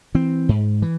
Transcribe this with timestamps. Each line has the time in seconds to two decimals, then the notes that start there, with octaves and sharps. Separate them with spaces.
0.15 E3 C4
0.49 G#2
0.82 E3